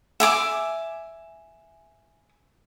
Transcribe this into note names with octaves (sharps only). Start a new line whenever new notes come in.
E5 G#5 D6